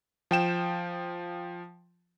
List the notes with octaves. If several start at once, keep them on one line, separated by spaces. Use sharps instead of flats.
F3 G5 E7